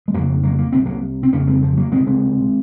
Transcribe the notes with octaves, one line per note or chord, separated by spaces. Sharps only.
G#3
F2 C#3 F#3 A#3
F#3 A#3
A#3
C2 C3 C4
F#3 A#3
C4
F2 C#3 A#3 C#4
G#3 C4
F3
F#3 A#3
C#2 C3 G#3 C4
G#3 C4